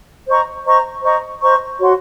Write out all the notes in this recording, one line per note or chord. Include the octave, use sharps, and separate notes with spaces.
C5 D#5 A#5 C#6
C5 D#5 A#5 C#6
C5 D#5 A#5 C#6
C5 D#5 A#5 C#6
F#4 C#5 F#5 C6